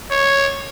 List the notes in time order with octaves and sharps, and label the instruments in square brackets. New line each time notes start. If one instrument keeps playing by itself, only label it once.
[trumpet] C#5